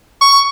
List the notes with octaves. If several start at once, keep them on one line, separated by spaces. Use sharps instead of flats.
C#6